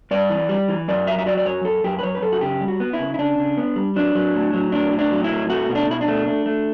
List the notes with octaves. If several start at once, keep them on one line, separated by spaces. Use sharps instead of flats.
G2 D5
E3
G3
E3
F#2 D5
F#3 E5
E5
F#3 D5
D5
F#2 C#5
F#2 A4
F#2 G4
B4
F#2 C#5
B4
F#2 A4
F#4
C#3 G4
G3
F#4
B3
E4
C#3
E4
C#3 D4
C#3
B3
G3
F#3 D4
F#3
A2
F#3
A2 D4
A2
D4
F#3
E4
A2
A3 F#4
B2
D4
B2 E4
D4
A3
A3
A3